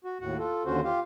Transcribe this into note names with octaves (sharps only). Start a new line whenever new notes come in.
F#4
D#2 A2 F#4 F#5
F4 A4
D#2 D3 C#4 F#4 C5
F4 G4 F5